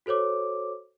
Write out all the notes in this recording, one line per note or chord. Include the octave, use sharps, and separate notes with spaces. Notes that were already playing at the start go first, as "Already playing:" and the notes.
F#4 A4 C5 C#5 D6